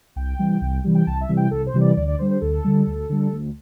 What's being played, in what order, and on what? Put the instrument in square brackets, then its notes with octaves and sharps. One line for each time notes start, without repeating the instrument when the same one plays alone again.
[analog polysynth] C2 G5
C3 E3 G3
C2
C3 E3 G3
G5
C2 A5
E5
C3 E3 G3
G5
C2 A4
C5
C3 E3 G3
D5
D2 D5
D5
D3 G3 C5
C5
D2 A4
D3 G3
D2
D3 G3
D2